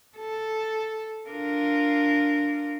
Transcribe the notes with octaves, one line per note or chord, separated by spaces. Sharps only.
A4
D4 F4 A#4